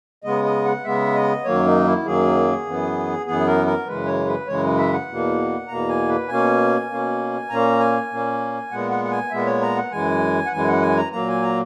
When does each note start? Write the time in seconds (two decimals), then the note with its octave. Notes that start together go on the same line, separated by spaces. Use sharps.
0.24 C#3 G#3 B3 D#5
0.45 D#5
0.65 F#5
0.85 C#3 G#3 B3 E5
1.15 D#5
1.45 F#2 D#3 F#3 A#3 C#5
1.66 D#4
1.85 E4
2.05 F#2 D#3 F#3 A#3 G#4
2.65 F#2 E3 B3
3.26 F#2 E3 B3 G#4
3.47 A#4
3.67 A#4
3.87 F#2 C#3 E3 G#3 B4
4.07 C#5
4.27 B4
4.48 F#2 C#3 E3 G#3 C#5
4.78 E5
4.93 F#5
5.08 E2 B2 A#3
5.68 E2 B2 A#3 A#5
5.89 G#5
6.09 B4
6.29 B2 A#3 C#4 G#5
6.90 B2 A#3 C#4
7.50 A#2 A#3 C#4 A#5
7.80 G#5
8.10 A#2 A#3 C#4
8.71 A#2 G#3 B3 F#5
8.91 F#5
9.05 F#5
9.11 G#5
9.31 A#2 G#3 B3 E5
9.46 C#5
9.62 A#5
9.76 F#5
9.91 F#2 E3 G#3 G#5
10.46 F#5
10.52 F#2 E3 G#3 G#5
10.67 F#5
10.82 G#5
10.97 A#5
11.12 A#2 F#3 A#3 A#5
11.28 G#5
11.43 A#5